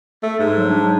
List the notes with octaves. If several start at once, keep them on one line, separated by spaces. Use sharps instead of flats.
A3
G#2
F#3
D4